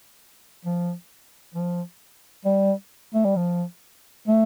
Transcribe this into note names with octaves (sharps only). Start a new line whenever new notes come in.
F3
F3
G3
A3
G3
F3
A3